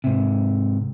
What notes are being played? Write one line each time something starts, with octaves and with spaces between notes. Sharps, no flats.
G#2 C3